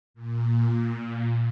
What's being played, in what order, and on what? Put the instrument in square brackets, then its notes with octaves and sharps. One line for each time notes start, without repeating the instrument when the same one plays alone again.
[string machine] A#2